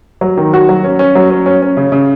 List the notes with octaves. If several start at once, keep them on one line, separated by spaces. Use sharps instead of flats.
F#3
D#3
F#4
F#3
C#4
C#4
F#3
C#4
C#4
C#4
C#3
C#3